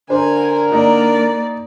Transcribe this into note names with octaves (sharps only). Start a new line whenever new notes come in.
D3 D4 A#4 C5 G#5
A#3 D#4 D5 D#5